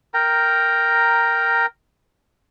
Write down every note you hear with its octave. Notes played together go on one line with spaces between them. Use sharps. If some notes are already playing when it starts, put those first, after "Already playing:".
A#4 G5 A#5